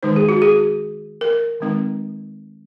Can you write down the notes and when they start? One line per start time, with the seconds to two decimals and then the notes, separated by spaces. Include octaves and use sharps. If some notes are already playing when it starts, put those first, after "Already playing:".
0.03 D#3 G#3 D#4 C5
0.16 G#4
0.29 F#4
0.42 G#4
1.21 A#4
1.60 D#3 G#3 C4 D#4